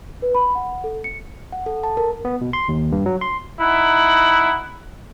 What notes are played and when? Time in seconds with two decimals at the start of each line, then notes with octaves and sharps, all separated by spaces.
0.22 B4
0.35 B5
0.55 F#5
0.84 A4
1.04 C#7
1.52 F#5
1.66 A4
1.84 A5
1.97 A#4
2.25 B3
2.41 B2
2.53 C6
2.69 D#2
2.92 G2
3.06 F#3
3.21 C6
3.60 D#4 E4 F#5